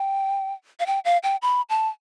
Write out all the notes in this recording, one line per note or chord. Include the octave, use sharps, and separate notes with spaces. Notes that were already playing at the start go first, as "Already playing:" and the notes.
Already playing: G5
F5
G5
F5
G5
B5
A5